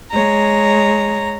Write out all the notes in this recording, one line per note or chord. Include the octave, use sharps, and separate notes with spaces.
G#3 C#5 A#5